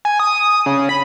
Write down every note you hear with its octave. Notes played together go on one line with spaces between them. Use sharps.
G#5
D#6
D#6
C#3
B5